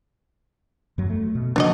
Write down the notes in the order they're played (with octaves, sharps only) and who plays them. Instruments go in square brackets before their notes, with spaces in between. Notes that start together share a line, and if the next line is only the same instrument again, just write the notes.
[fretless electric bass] F#2 F#3
A3
B2
[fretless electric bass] C#3 F3 A#3 [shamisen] D4 F#4 D#5